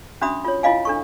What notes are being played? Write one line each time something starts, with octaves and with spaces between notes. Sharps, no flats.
C#4 D4 F#4 E5 B5 D#6
F4 C#5
E4 F4 D#5 F5 G#5
D4 A4 C#6